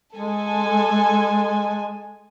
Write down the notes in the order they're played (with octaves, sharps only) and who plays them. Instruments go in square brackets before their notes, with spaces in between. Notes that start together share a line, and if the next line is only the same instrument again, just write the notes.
[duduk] G#3 [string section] A4 G#5